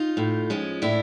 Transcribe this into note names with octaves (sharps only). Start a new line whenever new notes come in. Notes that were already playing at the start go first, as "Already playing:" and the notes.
Already playing: D#4 F4
A2
F3 G#3 C#4
A2 D4 E4